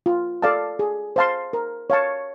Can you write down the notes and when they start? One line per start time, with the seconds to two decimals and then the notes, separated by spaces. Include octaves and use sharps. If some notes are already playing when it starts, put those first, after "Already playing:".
0.06 F4
0.42 A4 D5 F5 A5
0.79 G#4
1.16 C5 F5 A5 C6
1.53 A#4
1.90 C#5 F5 A5 C#6